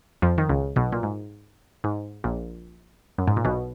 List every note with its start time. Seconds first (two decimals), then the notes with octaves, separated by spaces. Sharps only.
0.22 F2 F3
0.38 D#3
0.49 C#2 C#3
0.76 B1 B2
0.92 A#2
1.03 G#2
1.84 G#2
2.24 A#1 A#2
3.18 F#2
3.28 G#2
3.37 A#2
3.45 B1 B2